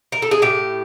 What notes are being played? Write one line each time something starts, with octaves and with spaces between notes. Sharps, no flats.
A#4
A4
G#4
A2 G4